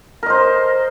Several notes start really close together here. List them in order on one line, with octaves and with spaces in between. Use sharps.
A#4 D#5 C5